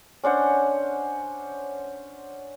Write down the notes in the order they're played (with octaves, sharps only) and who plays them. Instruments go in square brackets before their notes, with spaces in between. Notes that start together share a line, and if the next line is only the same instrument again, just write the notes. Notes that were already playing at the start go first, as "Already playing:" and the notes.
[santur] C#4 D4 C5 F#5